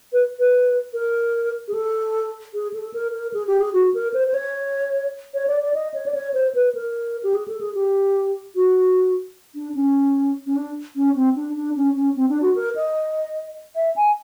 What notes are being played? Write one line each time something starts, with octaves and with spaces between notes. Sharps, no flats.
B4
B4
A#4
G#4
A4
G#4
A4
A#4
A#4
G#4
G4
G#4
F#4
A#4
C5
C5
C#5
C#5
D5
D5
D#5
C#5
D5
C#5
C5
B4
A#4
G4
G#4
A4
G#4
G4
F#4
D4
C#4
C#4
D4
C#4
C4
D4
D4
C#4
C#4
C4
D4
F#4
A#4
D#5
E5
G#5